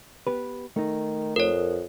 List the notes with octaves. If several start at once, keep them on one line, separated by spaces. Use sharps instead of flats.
B3 G4 B4
D#3 A3 D#4
F2 A#4 C#5